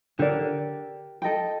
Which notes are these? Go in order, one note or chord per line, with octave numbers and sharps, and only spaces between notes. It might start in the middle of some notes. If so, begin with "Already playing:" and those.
D3 G4 A#4 D5
A4 D#5 G5